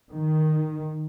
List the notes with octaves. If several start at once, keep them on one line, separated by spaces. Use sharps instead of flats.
D#3